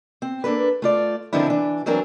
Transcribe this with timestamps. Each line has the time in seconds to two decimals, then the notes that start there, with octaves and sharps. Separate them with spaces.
0.22 C4
0.44 A#3 D4 A4 B4
0.82 A3 F4 D5
1.33 D3 D#3 F3 C4 D4 E4
1.47 E3 D4
1.86 E3 F#3 C4 D4 A#4